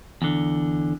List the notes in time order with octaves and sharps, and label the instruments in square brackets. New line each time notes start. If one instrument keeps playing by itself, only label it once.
[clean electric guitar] E2 D3